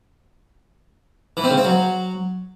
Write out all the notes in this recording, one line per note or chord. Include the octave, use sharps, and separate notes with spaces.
E3
C4
C#3
C4
F#3